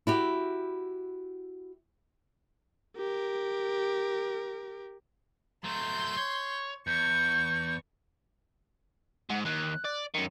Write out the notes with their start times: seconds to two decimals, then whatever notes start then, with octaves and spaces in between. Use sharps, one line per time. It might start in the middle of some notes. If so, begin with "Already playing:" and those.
0.07 E4 F#4 G4
2.97 G4 A#4
5.64 F#3 A3 C6 G6
6.17 C#5
6.87 E2 C#6 G6
9.29 G#2 F#5
9.45 D#2 F#6
9.84 D5
10.14 F#2 D#3 C#7